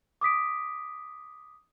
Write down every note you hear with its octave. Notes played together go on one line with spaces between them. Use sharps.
D6 D#6 B6 D7